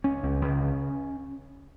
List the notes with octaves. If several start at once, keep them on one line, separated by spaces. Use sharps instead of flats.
C#2 C#4
C#2
C#2
C#3